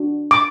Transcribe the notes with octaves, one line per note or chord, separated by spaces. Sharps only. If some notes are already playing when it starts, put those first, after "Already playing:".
Already playing: D4 F#4
D6